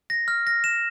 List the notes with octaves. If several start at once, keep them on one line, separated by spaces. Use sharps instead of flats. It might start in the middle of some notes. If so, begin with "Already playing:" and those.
A#6
F6
A#6
E7